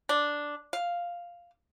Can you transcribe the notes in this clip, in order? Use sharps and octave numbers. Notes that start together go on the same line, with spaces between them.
D4
F5